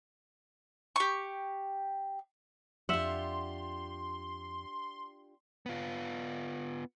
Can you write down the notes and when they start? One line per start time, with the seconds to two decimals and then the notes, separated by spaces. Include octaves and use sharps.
0.96 G4 C#6
2.89 F2 D4 F4 G4 E5 F#5 C6
5.66 B3 F4